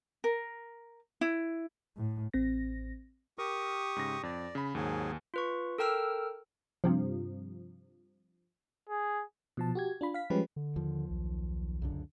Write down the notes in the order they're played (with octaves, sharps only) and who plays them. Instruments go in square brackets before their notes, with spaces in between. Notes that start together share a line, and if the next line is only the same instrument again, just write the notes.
[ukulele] A#4
E4
[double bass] A2
[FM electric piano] A1 C4 A#6
[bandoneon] G4 C#6 D#6 [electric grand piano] A#4
[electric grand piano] G#2 C#3 A#6
[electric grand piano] F2 [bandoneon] D5
[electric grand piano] C#3 B5
[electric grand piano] D#2 G#5 [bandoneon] G#2 F#3 G#4
[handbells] F4 B4 C#6
A4 A#4 G5 E6 F6
[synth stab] G2 C3 F3
[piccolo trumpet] G#4
[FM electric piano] B2 F3 A5
F#4 G4 G#6
D4 F4 B5
F5 B6
F3 G3 G#3 C#4 G4 B4
[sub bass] D3
[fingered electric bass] D#2 F3
[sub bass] B1
[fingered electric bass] C#2 F#2 D3